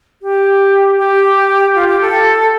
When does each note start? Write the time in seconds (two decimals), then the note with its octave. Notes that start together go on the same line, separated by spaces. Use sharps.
0.22 G4
0.98 G4
1.75 F4
1.88 G4
2.01 A4